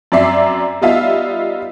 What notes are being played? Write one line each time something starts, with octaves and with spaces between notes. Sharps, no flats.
F#2 C4 D5 E5 C7
G3 B3 D#4 F4 E5 F5